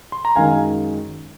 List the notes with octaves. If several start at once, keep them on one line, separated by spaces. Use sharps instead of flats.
C6
A#5
F#2 D#3 G#3 F5 G#5